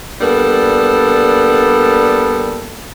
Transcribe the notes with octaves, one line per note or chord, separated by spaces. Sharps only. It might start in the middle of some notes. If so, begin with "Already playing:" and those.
G3 A#3 B3 D4 A4